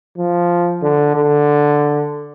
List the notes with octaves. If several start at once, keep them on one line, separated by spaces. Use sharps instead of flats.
F3
D3
D3